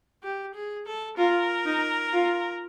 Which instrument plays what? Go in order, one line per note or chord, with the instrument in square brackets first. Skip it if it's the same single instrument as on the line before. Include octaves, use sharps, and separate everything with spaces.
[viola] G4
G#4
A4
[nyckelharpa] F4 [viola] A#4
[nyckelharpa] D#4
F4